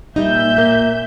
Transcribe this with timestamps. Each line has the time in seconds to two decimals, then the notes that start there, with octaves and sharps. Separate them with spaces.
0.16 A#2 G3 D#4 E5 G6
0.58 A#3